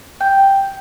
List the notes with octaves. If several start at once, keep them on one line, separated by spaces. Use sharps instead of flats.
G5